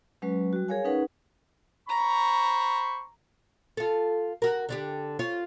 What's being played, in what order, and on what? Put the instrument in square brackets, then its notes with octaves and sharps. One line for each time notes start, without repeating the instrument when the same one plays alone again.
[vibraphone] F#3 G#3 C#4 B4
G3 F#4
G#4 A#4 C#5 F5 G#5
C#4 D#4 G#4 B4 F#5
[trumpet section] C5 B5 C#6 [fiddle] A#5
[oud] F4 A4
F#4 A#4
D3 D4 G4
F4 C#5